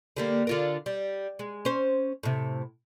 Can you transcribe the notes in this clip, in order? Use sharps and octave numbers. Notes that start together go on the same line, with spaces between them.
D3 G3 A#3
D3 F4 A#4
G3
G#3
C#4 C5
A2 C3